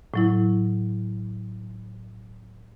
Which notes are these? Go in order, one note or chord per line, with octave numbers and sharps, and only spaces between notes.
A2 F#3 E4